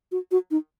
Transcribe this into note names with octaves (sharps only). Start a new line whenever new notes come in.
F#4
F#4
D#4